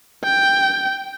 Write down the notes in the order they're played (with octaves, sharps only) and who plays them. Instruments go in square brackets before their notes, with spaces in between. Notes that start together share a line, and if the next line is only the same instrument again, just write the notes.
[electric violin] G5